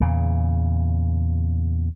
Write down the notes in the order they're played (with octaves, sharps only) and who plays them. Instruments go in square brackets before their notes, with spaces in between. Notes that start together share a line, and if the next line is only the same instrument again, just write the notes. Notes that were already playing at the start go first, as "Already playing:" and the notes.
[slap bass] E2 A#2 C#3